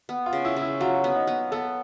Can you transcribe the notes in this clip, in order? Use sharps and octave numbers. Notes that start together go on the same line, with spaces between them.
B3
F4
C#3
E4
C#3
E4
F#3 F4
B3
D#4
B3
B3 A4